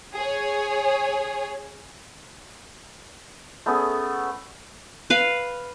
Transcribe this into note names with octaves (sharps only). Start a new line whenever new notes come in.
G#4 C#5
A3 B3 C#4 G#4
B4 F5